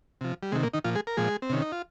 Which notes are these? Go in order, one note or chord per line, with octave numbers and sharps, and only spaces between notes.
C3 F3
G3
C3 D#3 G#3
A#2 A#3
D#3 D#4
A#2 F3 F4
G#3 G#4
A#4
A#2 F3 G#3 G#4
C4
C3 D#3 C#4
D#4
F4